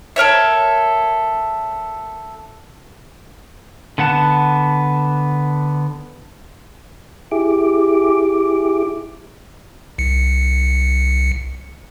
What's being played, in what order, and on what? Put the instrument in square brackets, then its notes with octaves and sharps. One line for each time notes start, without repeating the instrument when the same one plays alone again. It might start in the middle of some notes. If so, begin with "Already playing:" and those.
[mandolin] A4 A#4 C#5 E5
[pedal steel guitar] D3 B3 F#5 A5
[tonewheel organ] E4 G4 G#4 D6
[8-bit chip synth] C2 C#7